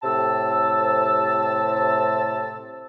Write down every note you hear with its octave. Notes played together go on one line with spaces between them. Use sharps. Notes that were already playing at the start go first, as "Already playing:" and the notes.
A2 C3 A5 E6